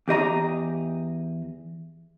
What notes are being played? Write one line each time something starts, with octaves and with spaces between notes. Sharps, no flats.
E2 G4 D#5 A#5